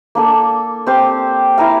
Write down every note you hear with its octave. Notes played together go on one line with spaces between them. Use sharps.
A#3 D4 A4
C4 G4 C5 F5
E4 A#4 F5